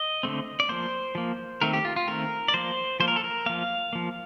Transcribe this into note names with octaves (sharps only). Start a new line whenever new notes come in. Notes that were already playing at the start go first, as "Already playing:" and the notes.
Already playing: D#5
D3 A3 C4
D5
F3 A#3 C5
F3 A#3
D#3 A3 C4 A#4
G4
F4
F4
D#3 A3 C4 A#4
D5
F3 A#3 C5
F3 A#3 C5
A#4
A4
A#4
F3 A#3 F5
F3 A#3